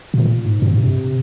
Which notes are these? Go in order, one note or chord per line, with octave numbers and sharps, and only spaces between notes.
A#2
G#2
G2
C3